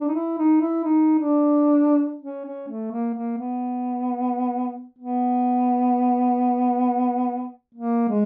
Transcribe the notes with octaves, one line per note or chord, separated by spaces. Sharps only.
D4
D#4
E4
D#4
E4
D#4
D4
C#4
C#4
A3
A#3
A#3
B3
B3
A#3
G#3